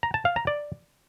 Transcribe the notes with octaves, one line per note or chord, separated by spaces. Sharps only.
A#5
A5
F5
A#5
D5